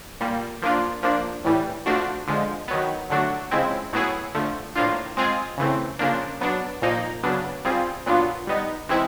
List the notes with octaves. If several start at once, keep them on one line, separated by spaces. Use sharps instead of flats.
A#2 G3 A#3
F3 A#3 D4 F4
F3 A#3 D4
A2 E3 G3
F3 A3 D4 F#4
D3 F3 G#3
D#3 F#3 B3
D3 F#3 A3 D4 F#4
C#3 F3 G#3 C4 E4
A2 F#3 B3 E4 G#4
D3 F3 A3
A2 F3 A#3 D4 F4
G#3 C4 F4 G#4
C#3 E3 A3 C4
C#3 F3 A#3 D4
F#3 B3 D4
A#2 F3 A#3 D#4
C#3 F#3 B3 D4
G3 C4 F4 G#4
A#2 F#3 B3 D4 F4
G3 B3 D#4
C3 E3 G#3 C4 E4